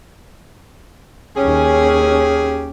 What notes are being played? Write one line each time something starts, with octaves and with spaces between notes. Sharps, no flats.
D#2 C#4 G4 G#4